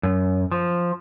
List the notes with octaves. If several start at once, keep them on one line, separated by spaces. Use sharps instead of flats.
F#2
F3